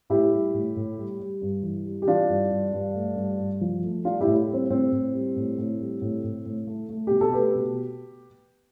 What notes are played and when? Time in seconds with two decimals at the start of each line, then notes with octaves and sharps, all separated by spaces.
0.10 A2 E4 G4
0.32 G3
0.54 A2
0.76 A2
0.98 G3
1.20 G3
1.42 G2
1.63 E3
1.85 G3
2.02 G4
2.07 E3 D4 F4
2.29 G2
2.51 G2
2.73 G2
2.95 A3
3.16 G2
3.39 G2
3.61 F3
3.83 A3
4.04 G3 D4 F4
4.21 E4 G4
4.26 A2
4.48 G3
4.54 C4
4.70 A2 C4
4.92 A2
5.13 G3
5.36 A2
5.58 A2
5.80 G3
6.01 A2
6.24 A2
6.46 A2
6.67 A3
6.89 A3
7.07 B2 G4
7.21 A4
7.33 A3 G4 B4
7.55 B2